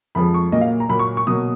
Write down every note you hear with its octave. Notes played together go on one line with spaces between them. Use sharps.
F2 F3 G#3 B5
C#6
A#2 F#3 A#3 D#5
F5
A#5
A#2 F#3 A#3 B5
C#6
C#6
B2 F#3 A#3 D#6